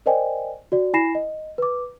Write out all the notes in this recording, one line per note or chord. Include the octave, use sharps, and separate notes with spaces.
A#4 C5 D5 D#5 G5 G#5
F#4 D5
E4 G#5 B5 A#6 C7 E7
D#5
B4 D6